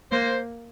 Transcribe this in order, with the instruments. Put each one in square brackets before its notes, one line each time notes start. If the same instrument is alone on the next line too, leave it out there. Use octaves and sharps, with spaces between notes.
[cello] A#3 [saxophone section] C5